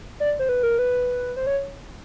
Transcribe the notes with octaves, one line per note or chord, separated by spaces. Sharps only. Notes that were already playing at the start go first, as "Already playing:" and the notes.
D5
C5
B4
A#4
B4
C5
C#5